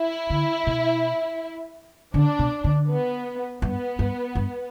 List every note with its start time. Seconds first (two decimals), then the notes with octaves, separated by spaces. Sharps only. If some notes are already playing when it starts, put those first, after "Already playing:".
Already playing: E4
0.30 D3
0.67 B2
2.14 D3 D4
2.39 B2
2.64 D3
2.88 B3
3.62 G2 B3
3.99 G2
4.35 G2